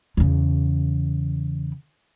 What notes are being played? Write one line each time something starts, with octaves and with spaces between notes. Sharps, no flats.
E2 C#3